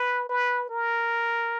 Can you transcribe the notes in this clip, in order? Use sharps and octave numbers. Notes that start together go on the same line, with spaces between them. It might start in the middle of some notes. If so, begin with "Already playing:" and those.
Already playing: B4
B4
A#4